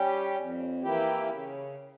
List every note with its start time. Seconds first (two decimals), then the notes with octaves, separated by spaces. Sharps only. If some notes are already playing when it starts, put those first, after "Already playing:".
Already playing: G3 C#4 G4
0.36 F2
0.82 E3 A#3 E4 G4
1.29 C#3